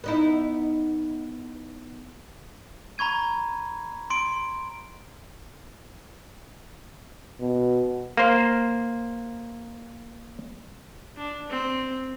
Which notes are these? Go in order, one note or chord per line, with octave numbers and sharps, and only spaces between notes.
B3 D#4 E4
A#5 B5 C#6 G#6 D#7
C6 D7
B2
A#3 C5
D4
C4